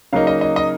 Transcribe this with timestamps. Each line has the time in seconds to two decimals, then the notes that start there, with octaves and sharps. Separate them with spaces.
0.13 C#3 F#3 A#3 D#4 F5
0.27 D#5
0.41 D#5
0.56 D#5